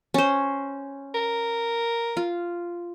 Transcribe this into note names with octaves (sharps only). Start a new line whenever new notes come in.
C#4 C5
A#4
F4